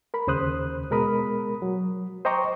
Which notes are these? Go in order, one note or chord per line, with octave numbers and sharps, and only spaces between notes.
A#4 B5
D#2 C#3 C5 D#6 F#6
B2 G#3 A#4 B5 D#6
F#3
C5 D#5 G5 A#5 C#6 D6